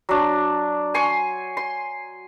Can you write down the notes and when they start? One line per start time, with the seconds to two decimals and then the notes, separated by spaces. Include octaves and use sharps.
0.09 F#3 D4
0.94 G#5 C6 C#6
1.57 C6